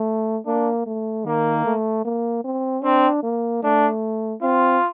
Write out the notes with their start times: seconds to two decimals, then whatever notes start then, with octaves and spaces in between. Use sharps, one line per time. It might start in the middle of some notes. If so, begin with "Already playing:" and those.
Already playing: A3
0.46 A#3 D4
0.87 A3
1.26 D#3 A#3
1.65 A3
2.05 A#3
2.45 C4
2.83 C4 D4
3.23 A#3
3.63 A3 D4
4.42 C4 F4